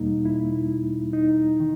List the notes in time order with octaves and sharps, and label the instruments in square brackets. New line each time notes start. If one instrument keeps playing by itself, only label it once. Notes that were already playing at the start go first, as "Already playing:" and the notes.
Already playing: [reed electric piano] E2 B2 G3 A#3 D#4
E4
D#4
D#3